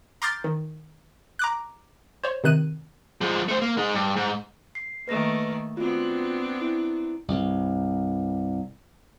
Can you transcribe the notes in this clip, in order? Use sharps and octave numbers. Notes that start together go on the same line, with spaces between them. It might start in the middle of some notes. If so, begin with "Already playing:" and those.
A#5 C6 D6 F6 G6 A6
D#3
A#5 D6 F#6
C5 C#5
C3 D#3 F#6 D#7
F3 G#3
A3 C5
A#3
G#3 D#4
G2
G#2
C7
D#3 A3 A#3 B4 A#6
B3 C4 D4 F4 F#4
E4
C2 G2